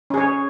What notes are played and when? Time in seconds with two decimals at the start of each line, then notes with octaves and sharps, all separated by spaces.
0.10 C#4
0.14 G#4
0.17 C#5